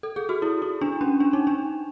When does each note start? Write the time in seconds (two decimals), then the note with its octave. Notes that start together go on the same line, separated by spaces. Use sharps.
0.03 A4
0.16 G#4
0.29 F#4
0.42 E4
0.62 E4
0.81 D4
1.01 C#4
1.20 D4
1.33 D#4
1.47 D4